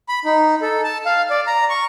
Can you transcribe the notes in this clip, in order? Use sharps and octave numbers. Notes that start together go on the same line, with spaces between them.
B5
D#4
A4
A5
F5
D5
A#5
C#6